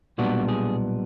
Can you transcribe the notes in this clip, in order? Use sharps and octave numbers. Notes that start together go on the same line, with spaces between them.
B1 A#2 G3 B3 D4 F#4
G#4